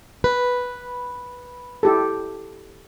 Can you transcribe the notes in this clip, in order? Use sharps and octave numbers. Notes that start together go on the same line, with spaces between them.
B4
E4 G4 A4